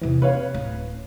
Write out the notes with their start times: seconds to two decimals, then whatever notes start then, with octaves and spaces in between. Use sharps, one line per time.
0.01 E2 C3 E3
0.22 C4 B4 C#5 F5
0.54 D1 C#4